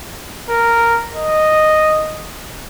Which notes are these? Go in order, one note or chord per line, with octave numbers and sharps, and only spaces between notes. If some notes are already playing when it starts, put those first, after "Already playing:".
A#4
D#5